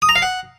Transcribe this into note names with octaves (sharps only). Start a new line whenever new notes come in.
D#6
A#5
F5
F#5